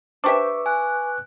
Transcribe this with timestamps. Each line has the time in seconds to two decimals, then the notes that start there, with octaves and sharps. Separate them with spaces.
0.24 D4 G4 B4 C5 E5 C#6 D6
0.66 G#5 F#6